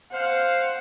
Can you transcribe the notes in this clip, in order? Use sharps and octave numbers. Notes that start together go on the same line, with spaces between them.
C5 F5 F#5